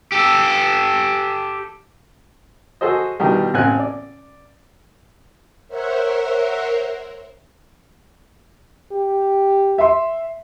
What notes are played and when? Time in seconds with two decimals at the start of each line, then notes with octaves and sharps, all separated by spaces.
0.12 G4 A4
2.81 F#4 G#4 A4 C5 D#5
3.20 B2 D#3 E3 G3
3.54 A1 C4 G#5 F#6
3.79 D5
5.68 A#4 C5 C#5 E5 F#5
8.92 G4
9.78 E5 C6